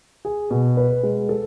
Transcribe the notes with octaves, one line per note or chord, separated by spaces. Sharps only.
G#4
B2
B4
G#3
A4